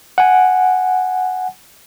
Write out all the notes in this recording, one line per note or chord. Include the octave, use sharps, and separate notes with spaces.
F#5 G#5